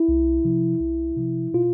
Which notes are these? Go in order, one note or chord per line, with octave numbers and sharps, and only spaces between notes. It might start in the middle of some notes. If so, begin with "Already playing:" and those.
Already playing: E4
C2
C3 F3
C2
C3 F3
B2 F4